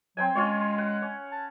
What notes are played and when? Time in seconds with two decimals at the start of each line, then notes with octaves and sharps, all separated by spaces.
0.17 F#3 C4 G5 G#5
0.35 G#3 C#4 F4 C#5
0.78 F#5
1.02 C#4
1.32 A5